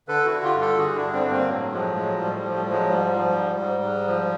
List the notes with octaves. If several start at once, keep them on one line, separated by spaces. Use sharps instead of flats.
D3 A4 B4
E4 F#4
D3
F4 G4
G2
G4 A4
D3 F#4 G#4
D4 E4
G2
C4 D4
G2
A#3 C4
A2 F#3
F3 F#3 G#3
A2 F#3 G#3
A2 G3
G3
F3
G3
F3
F#3 G#3
G#2 G3
F3
G#2
G#2
G#2
F3